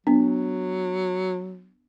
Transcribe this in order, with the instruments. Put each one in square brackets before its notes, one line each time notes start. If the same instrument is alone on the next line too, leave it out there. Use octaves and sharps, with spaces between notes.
[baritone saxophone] F#3 [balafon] B3 D4